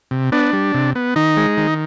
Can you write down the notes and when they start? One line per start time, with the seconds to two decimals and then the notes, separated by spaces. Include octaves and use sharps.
0.11 C3
0.32 B3 D4
0.53 G3
0.74 C3
0.95 B3
1.16 D#3 D#4
1.37 G#3
1.57 D#3